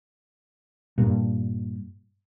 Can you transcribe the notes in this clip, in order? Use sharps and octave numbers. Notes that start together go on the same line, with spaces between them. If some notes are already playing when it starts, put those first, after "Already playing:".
G2 A#2